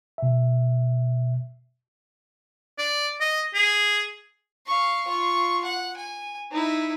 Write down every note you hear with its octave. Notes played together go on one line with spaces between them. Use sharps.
B2 E5
D5
D#5
G#4
F5 C#6
F4 C#6
F#5
G#5
D#4 E4